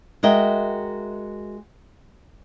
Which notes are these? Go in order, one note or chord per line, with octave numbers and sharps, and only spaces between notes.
G#3 F#4 A#4 D#5 E5 G5